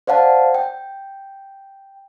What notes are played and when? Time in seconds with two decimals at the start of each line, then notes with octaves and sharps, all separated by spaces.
0.07 C5 D5 F5 F#5 A5
0.55 G5